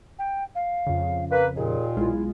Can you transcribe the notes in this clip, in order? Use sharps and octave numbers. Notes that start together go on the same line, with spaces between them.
G5
F5
F2 C#3
A#3 B4
D#2 A#2 G#4
B1 G#3 E4 F4